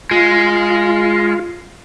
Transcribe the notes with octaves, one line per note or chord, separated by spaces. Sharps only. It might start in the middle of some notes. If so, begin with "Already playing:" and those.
G#3 F4